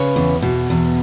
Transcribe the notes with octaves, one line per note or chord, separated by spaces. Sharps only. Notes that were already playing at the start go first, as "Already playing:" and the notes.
Already playing: C#3 B4 C#5
E2
B2
E2